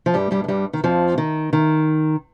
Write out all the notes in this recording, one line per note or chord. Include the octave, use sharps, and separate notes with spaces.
F3
G2 G3
G2 G3
G#3
G2 G3
D#3
F2 F3
D#3
D#3